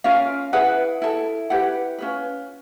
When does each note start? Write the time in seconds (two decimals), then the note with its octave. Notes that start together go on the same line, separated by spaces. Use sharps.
0.04 C#4 F4 A#4 F5
0.53 E4 G#4 B4 F#5
1.02 E4 A4
1.50 E4 G4 B4 F#5
1.98 C#4 F4 G#4 B4